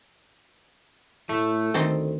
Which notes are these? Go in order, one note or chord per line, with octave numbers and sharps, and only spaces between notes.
A2 A3
D2 D#3 C4 A4